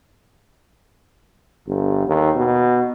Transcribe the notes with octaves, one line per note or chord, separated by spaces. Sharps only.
G1
D#2
B2